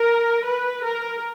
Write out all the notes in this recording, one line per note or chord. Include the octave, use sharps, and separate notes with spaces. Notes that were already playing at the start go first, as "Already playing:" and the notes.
Already playing: A#4
B4
A#4